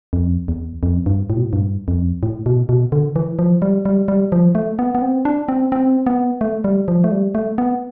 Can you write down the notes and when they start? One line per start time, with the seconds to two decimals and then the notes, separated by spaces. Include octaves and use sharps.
0.13 F2
0.48 E2
0.83 F2
1.06 G2
1.30 A2
1.37 B2
1.44 A2
1.53 G2
1.88 F2
2.23 A2
2.46 B2
2.69 B2
2.92 D3
3.16 E3
3.39 F3
3.62 G3
3.85 G3
4.08 G3
4.32 F3
4.55 A3
4.79 B3
4.95 B3
5.02 C4
5.25 D4
5.48 C4
5.72 C4
6.06 B3
6.41 A3
6.64 G3
6.88 F3
7.04 A3
7.11 G3
7.35 A3
7.58 B3